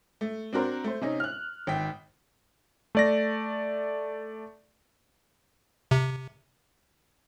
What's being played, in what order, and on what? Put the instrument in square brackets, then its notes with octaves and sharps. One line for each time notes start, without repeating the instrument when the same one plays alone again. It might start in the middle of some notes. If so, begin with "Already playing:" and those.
[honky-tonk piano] A3
C4 D4 F#4 A#4 C5
A3 C5
C3 C#4 D#4
F6 F#6
G#1 G5 B6
[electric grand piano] A3 D5 A#6
[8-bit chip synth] C3